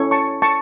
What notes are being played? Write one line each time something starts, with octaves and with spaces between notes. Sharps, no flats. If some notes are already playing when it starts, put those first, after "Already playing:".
Already playing: C#4 E4 A4 C#5
A5 C#6
A5 C#6